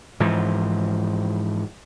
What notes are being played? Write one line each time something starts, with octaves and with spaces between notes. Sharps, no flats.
G#2 E3 F3